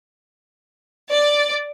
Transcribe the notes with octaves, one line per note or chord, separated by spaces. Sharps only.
D5